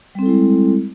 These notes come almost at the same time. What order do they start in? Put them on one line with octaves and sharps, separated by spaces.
G3 C4 A4 E4 G#3